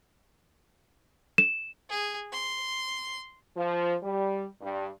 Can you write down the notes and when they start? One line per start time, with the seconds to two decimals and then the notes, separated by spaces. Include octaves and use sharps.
1.38 E7
1.90 G#4
2.33 C6
3.57 F3
4.03 G3
4.62 G2